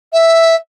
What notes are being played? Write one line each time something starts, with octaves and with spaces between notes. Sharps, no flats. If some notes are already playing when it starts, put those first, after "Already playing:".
E5